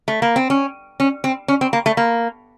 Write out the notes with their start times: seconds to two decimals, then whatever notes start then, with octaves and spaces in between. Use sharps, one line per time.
0.08 A3
0.22 A#3
0.36 C4
0.50 C#4
1.00 C#4
1.24 C4
1.48 C#4
1.61 C4
1.73 A#3
1.86 A3
1.97 A#3